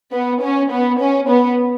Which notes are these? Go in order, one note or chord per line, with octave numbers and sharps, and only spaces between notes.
B3
C#4
B3
C#4
B3